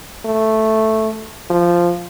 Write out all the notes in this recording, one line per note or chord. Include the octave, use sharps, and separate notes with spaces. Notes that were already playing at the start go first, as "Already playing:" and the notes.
A3
F3